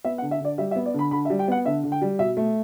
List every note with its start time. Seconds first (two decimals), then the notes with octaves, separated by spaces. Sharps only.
0.04 B3 E5
0.18 F#5
0.22 D3
0.31 E5
0.40 D3 D5
0.58 G3 E5
0.71 E5
0.76 B3
0.86 D5
0.94 D3 B5
1.11 D3 B5
1.25 E5
1.30 G3
1.39 G5
1.48 B3 F#5
1.65 D3 E5
1.84 D3
1.92 G5
2.02 G3
2.19 B2 E5
2.37 A3